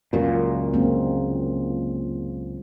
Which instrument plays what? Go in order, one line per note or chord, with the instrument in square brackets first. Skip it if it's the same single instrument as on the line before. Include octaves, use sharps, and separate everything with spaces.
[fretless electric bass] C#2 F#2 A#2 [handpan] F4
[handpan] G#3 A#3 C4